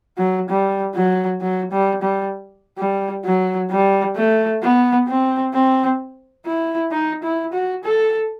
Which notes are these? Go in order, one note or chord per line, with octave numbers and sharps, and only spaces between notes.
F#3
G3
F#3
F#3
G3
G3
G3
F#3
G3
A3
B3
C4
C4
E4
D#4
E4
F#4
A4